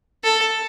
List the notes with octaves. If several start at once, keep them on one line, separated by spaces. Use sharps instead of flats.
A4